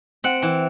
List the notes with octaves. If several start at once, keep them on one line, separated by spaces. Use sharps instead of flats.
C4 F#5
E3